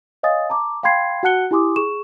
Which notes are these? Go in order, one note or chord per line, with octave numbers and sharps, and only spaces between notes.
C#5 D#5 F5 G#5 D#6 A6
A5 A#5 D6
F5 G5 B5 C6 G#6 C7
F#4 F#5 A5 F#6 C#7 G7
E4 G4 G#5 C6 D6 D#6
G#4 C#6 E7